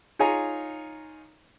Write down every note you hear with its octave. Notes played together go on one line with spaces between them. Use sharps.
D#4 F4 G#4 C#5 G#5 A#5